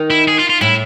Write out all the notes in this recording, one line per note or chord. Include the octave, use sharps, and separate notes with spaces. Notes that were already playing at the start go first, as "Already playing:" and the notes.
Already playing: D#3
E4
G#4
F4
F4
A2 E4